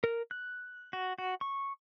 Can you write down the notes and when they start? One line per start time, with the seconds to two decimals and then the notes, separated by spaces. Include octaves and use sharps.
0.04 A#4
0.31 F#6
0.93 F#4
1.18 F#4
1.41 C#6